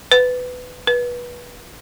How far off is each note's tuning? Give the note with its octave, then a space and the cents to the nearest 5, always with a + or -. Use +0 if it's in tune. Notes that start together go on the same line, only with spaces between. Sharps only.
B4 +15
B4 -25